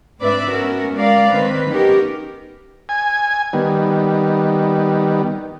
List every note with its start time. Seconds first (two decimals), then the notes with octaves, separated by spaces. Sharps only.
0.20 G#2 C4 D4 B4 D5 E5
0.51 B3 C#4 F#4 A#4
0.95 G#3 A#4 D5 F5
1.29 D#3 G#3 C4 B4
1.69 B3 C#4 D#4 G4 A#4
2.89 G#5
3.53 D#3 G3 B3